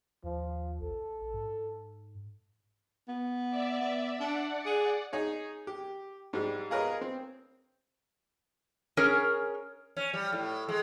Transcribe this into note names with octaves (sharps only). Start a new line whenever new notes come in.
D#2 F3
A1 A4
G#2
B3
D5 E5
B3
D4 D5 F#5
G#4
D#4 G#4 C#5
G4
G#2 G3
F4 G#4 A#4 B4 C#5 D#5
C4
C#4 G#4 A#4 C#5
C#4
G3
A2
G#3